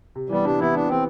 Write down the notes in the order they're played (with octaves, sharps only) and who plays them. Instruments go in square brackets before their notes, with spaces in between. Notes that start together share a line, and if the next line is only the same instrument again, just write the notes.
[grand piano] C3
[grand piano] E3 B3 [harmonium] G3
[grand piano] C3 [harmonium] D4
[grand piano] E3 B3 [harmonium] E4
[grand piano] C3 [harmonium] D4
[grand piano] E3 B3 [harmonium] C4